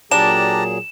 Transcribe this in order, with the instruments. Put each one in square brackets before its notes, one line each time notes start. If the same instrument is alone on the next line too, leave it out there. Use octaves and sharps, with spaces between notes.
[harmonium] A#2 F#3 G#4 [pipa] D4 [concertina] G4 A5 A#5 [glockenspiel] E7